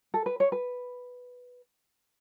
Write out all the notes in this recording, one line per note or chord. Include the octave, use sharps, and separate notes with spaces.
A4
B4
C#5
B4